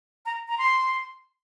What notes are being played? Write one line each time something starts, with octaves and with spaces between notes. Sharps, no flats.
A#5
A#5
C6